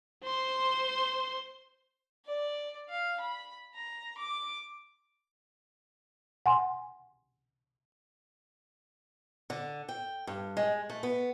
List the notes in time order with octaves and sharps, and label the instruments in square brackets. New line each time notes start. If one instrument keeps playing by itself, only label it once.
[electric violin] C5 C6
[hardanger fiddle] D5
F5
B5
A#5
D6
[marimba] F#5 G#5 C6
[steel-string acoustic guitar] D3
G5
G2
G#3
A3
B3